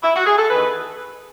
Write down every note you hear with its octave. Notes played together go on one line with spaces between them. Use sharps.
E4
F#4
G#4
A4
E2 D#3 B4